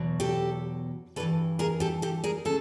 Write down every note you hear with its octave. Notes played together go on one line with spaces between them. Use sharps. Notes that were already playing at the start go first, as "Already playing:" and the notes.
Already playing: E2 B2 F#3
G4 A4
G2 E3 A4 B4
G#4 A#4
G4 A4
G4 A4
G#4 A#4
C#3 A4